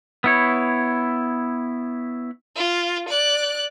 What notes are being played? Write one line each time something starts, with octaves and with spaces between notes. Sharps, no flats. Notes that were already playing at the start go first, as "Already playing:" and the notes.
B3 E4 C#5
F4
D5 F#6